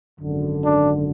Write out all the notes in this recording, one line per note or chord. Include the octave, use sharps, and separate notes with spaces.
G#1 F#2 D3
D4